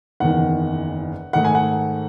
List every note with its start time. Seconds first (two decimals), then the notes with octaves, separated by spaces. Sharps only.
0.20 F#1 E2 D#3 F#5
1.33 G#2 D#3 A3 D#4 F#5
1.45 G#5
1.55 F#5